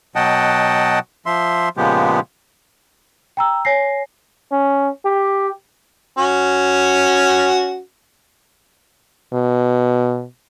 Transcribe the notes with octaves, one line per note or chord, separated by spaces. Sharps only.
B2 F#3 D#5 F#5 G5 A5
F3 E5 C6
A#2 C#3 F3 G#3 B3 G4
G5 A#5 E6
C#5 G#5 A#6 C7
C#4
G4
C#4 F#4
B2